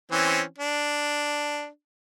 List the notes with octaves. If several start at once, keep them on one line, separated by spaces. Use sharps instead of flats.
E3 C4 C#4
D4